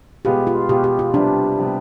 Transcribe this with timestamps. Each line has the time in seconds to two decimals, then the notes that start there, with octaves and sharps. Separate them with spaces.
0.25 B2 G#3 B3 F4 G4
0.47 F4
0.69 B2 G#3 B3 F4 G4
0.84 G4
0.99 F4
1.14 C3 G3 B3 D4
1.59 C3 G3 B3